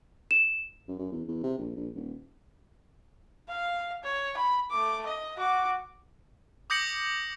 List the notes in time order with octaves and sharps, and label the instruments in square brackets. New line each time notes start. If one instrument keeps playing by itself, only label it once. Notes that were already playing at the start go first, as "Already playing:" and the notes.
[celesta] E7
[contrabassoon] F#2
F#2
E2
E2
C3
A#1
A#1
D#1
[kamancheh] F5
C#5
B5
A3 D6
D#5
F#4 D6
[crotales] D6 D#6 G6 A#6 C#7 F#7